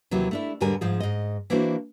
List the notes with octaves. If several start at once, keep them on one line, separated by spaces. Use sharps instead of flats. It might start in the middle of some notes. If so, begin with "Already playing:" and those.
D#2 C3 E3 F#3
A3 D4 E4
E2 G#2 D3 G3 A#4 G#5
G#2 F3 G#4
G#2 D#5
E3 A#3 D4 E4 F#4 C5